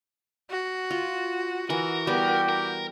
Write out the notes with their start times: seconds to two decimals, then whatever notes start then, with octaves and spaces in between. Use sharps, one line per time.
0.50 F#4
0.91 F4
1.70 E3 F#4 A#4
2.07 G3 B3 G4
2.49 A#4